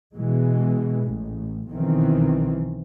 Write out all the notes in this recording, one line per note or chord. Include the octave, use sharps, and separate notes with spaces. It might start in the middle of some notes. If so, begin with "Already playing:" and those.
B2 E3 G#3
A1
B1 D#3 E3 C4